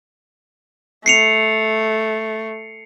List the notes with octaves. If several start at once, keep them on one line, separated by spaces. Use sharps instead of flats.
A3 C7 C#7 F7